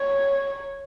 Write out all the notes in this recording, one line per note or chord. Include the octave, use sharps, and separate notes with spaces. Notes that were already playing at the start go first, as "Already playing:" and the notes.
Already playing: C#5